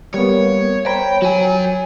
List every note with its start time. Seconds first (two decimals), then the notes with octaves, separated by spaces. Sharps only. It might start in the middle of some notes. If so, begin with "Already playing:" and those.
0.14 G3 A#3 B3 C#5
0.86 C5 C#5 G5 A#5 B5
1.22 F#3 F#4 G#5